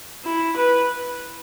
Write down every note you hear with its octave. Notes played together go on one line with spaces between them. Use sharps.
E4
B4